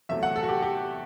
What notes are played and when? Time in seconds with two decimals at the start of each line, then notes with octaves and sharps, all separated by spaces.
0.09 E2 C3 F#3 A3 E5
0.23 F#5
0.36 A4
0.43 F#4
0.49 G4
0.62 G4